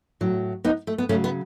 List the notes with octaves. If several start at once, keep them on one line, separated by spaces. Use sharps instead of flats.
A2 F#3
B3 D#4
A3
B3
C#3 F#3 A3 C#4
B3